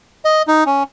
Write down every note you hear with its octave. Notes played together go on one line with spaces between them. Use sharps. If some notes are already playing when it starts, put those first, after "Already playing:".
D#5
D#4
C#4